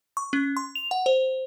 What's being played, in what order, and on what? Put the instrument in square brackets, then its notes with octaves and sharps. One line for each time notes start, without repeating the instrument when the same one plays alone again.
[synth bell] C#6
C#4
C6
F7
F#5
C5